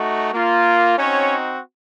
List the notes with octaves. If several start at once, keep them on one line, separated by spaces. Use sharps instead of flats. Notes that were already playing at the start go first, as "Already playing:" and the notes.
Already playing: A3 D#4 F#4
A#3 F4
C4 C#4 D#4 F#4 C#5